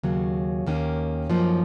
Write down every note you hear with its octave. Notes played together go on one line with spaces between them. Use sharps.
D#2 C#3 F#3 C#4
D#2 D#3 A#3 C#4
F#2 F3 A#3 D#4